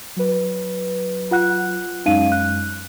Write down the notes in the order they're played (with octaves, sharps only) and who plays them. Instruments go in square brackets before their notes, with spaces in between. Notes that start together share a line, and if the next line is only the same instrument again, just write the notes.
[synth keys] F#3 B4
[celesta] F4 F#5 F#6
[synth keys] F#2 G#3 C#4 [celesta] D#4 F5 D#7
[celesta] F#6